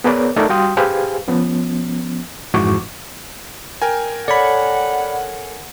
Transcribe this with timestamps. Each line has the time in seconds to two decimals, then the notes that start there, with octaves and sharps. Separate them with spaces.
0.04 B3 G#4 A#4 B4 C#5 D5
0.36 A3 D#4 A4 A#4 D5
0.49 G3 F#4 F5 G5 C6 D#6
0.77 G4 G#4 B4 C5 F5 G#5
1.28 F3 B3 C#4
2.54 F2 G#2 E3 F#4 C#6 D6
3.82 A#4 G5 G#5
4.28 A4 C#5 D5 F#5 B5